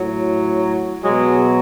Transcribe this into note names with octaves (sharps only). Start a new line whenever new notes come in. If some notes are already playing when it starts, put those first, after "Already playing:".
Already playing: A2 F#3
B2 F#3 G#3